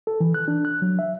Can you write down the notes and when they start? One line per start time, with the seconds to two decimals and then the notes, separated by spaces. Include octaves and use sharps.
0.07 A4
0.20 E3
0.34 F#6
0.48 D4
0.65 F#6
0.82 F#3
0.99 E5